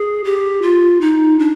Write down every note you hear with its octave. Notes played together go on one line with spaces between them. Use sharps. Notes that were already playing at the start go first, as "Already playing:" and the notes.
Already playing: G#4
G4
F4
D#4
D4